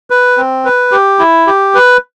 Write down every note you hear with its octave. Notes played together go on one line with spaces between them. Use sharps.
B4
C4
B4
G4
E4
G4
B4